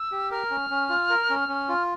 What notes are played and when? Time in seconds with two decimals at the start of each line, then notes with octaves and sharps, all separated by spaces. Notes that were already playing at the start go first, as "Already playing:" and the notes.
Already playing: E6
0.12 G4
0.31 A#4 F6
0.50 C#4
0.70 C#4
0.89 F4
1.10 A#4
1.30 C#4
1.48 C#4
1.69 F4